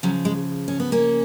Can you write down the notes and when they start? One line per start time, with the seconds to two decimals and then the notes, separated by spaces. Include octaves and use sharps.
0.03 C#3 F3 F#3
0.25 G#3
0.68 C#4
0.80 B3
0.92 A#3 C#4